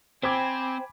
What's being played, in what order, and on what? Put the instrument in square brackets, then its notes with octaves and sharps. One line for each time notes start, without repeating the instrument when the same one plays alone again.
[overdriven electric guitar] C4 [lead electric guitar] C5 G5 [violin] G#5 B5 [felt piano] D6 G#6 B6